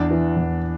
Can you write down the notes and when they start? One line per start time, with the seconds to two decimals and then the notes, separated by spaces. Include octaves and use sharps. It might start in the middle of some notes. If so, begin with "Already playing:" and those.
Already playing: E2 D4
0.11 E3
0.36 E2